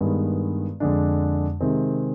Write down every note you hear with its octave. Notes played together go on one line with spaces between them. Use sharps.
G2 D#3 G#3 B3
F2 D3 G#3 D4
C3 D#3 G#3 C4